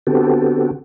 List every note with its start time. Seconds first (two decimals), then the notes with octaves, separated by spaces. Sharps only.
0.07 D3 B3 C4 F#4 G4 A4